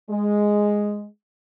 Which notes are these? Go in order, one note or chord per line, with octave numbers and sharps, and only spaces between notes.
G#3